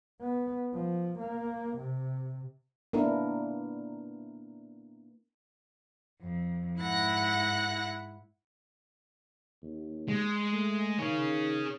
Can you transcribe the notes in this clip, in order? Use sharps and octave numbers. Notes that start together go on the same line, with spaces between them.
B3
F3
A#3
C3
A#3 B3 D4 E4 A#4
F2
G#2 E4 F#5 F#6 A#6
D#2
G#3
A3
D#3 G#4 C#5